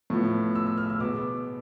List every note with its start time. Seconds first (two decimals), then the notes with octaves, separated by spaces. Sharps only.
0.10 A2 F3 B3
0.55 E6
0.67 E6
0.78 F6
0.90 E6
1.00 B2 G#3 B3 D6